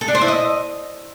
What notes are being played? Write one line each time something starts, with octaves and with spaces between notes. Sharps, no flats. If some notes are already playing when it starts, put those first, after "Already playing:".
A4
D4
C5
E4
D#5